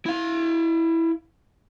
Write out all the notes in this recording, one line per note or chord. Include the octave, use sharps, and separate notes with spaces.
E4 F5